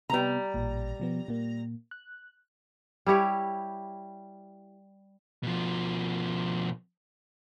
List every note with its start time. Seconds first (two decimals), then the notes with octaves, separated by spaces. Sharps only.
0.10 C3 G3 B3 A#5
0.54 A1 A#2
1.00 B2 F3 B3
1.28 A#2 A#3
1.91 F#6
3.07 G3 E4 G4 C#5
5.43 B2 F3